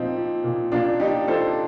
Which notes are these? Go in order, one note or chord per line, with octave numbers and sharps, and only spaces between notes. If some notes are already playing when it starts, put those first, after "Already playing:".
Already playing: A#2 F3 C4 D#4
F3
A#2
A#2 D4 F4
F3 D#4 G4
F3 A4 C5